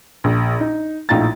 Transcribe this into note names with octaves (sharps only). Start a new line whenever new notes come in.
A#1
D#4
A#1 A2 D#4 F4 A#5 A6